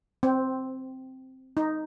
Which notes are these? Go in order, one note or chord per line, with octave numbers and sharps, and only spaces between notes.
C4
D#4